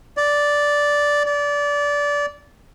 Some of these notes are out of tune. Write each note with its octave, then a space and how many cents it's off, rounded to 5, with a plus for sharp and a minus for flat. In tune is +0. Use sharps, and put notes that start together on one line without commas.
D5 -5
D5 -20